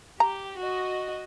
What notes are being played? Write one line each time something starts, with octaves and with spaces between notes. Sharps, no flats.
G4 A#5
F#4 D#5